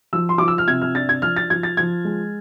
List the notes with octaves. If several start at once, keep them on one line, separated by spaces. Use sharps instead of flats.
F3 E6
C6
F3 D6
E6
F6
C3 G#6
F6
D4 A6
G#6
F3 F6
A6
F3 G#6
A6
F3 G#6
G#3